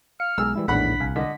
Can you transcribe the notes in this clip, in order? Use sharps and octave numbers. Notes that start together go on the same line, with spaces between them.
F5 F6 C#7
B1 G#3 G#4 A#5 E6
E3 G3 E4
A#1 E2 A2 D#3 D4 F#5 B5 B6
C2 F5 G#5
D3 D#5 B6